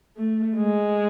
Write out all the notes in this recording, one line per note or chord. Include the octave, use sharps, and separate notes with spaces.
A3
G#3